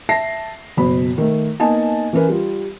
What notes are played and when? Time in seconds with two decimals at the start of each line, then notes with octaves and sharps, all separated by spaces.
0.09 E5 A5 A#6 C7
0.77 F#1 B2 B5
1.18 D#3 A3
1.60 A#3 B3 D#4 D#5 G#5 A5
2.13 E3 C#4 A#4 B4
2.29 G3 F4